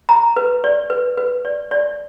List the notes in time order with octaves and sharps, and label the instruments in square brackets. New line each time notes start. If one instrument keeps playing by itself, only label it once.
[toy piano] A#5
B4
D5
B4
B4
D5
D5